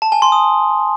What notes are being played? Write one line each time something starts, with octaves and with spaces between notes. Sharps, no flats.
A5
G#5
C6
D#6